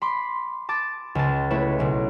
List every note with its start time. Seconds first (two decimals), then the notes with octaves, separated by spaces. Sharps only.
0.02 B5 C6 D6
0.69 A5 D6 A6
1.15 C#2 A5
1.50 A3 E4 B4 C#5 E5
1.79 B1 C#3